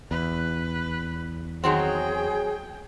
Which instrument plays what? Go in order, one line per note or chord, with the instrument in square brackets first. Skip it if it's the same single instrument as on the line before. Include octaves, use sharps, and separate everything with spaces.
[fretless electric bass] E2 [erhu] B4
[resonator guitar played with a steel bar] D#3 F#3 C4 [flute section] G#4 [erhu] G5